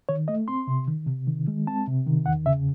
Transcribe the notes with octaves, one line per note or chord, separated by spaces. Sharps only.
D#3 C#5
A3 D#5
C4 C6
C3
D#3
C3
D#3
G#3
C4 A5
C3
D#3
E2 F#5
C#3 E5